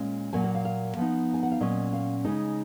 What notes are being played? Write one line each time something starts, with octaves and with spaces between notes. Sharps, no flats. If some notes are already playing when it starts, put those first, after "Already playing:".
Already playing: A#2 G#3 C#4
A#2 F#3 A#3 G#5
F#5
F5
F5
F3 B3 D#4
G#5
F#5
F5
A#2 F#3 C#4 D#5
F5
C#3 G#3 D#4 D#5